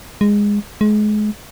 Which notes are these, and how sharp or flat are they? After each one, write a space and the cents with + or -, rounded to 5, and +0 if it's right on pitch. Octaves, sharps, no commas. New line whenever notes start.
G#3 -15
G#3 +30